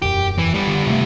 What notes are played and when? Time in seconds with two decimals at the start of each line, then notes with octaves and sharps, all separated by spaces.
0.02 E1 F#2 G4
0.38 E3
0.54 G3 B3
0.67 D3
0.87 C3 A3